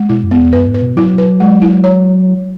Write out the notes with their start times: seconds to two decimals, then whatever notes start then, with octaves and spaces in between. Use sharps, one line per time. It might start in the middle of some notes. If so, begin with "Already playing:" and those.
Already playing: G#3
0.09 B2 E4
0.24 F#2
0.31 B3
0.39 E2
0.53 F#2 B4
0.67 G#2
0.74 B4
0.82 B2
0.96 F#3 E4
1.18 B4
1.40 G#3
1.62 E4
1.84 C#5